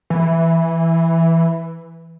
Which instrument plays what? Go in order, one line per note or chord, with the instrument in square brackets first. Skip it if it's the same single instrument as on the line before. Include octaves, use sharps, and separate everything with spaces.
[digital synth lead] E3